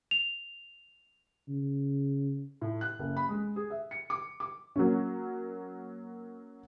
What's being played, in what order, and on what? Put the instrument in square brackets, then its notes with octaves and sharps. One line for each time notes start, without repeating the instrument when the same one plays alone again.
[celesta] F7
[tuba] C#3
[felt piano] A2
F#6
F#1
B5
G#3
G#4
E5
C#7
D6
D6
[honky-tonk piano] F#3 A#3 C#4